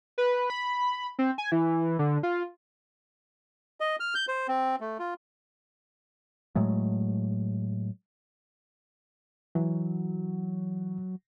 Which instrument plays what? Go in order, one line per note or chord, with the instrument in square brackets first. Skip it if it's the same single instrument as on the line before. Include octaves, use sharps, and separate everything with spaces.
[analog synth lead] B4
B5
C4
G#5
E3
D3
F4
[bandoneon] D#5
F6
G6
C5
C4
A3
F4
[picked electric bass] A2 F#3 G#3 A3
[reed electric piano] E3 [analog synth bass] F#3